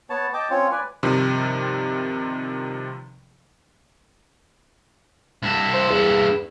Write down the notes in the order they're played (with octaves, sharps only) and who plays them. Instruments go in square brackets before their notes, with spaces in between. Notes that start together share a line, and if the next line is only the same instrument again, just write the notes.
[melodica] B3 C#5 A5
D#5 G5 A5 D6
C4 C#4 F4 C#5
B4 D5 G#5
[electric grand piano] G2 C3 D#3 F3
[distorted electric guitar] G2 E4
[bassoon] C5
E2